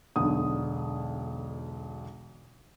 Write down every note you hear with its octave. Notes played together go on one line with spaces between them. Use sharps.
E1 B1 D3 D#6